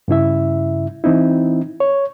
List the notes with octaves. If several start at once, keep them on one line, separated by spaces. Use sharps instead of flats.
G2 C#3 E4 E5
E3 C4 D#4 E4
C#5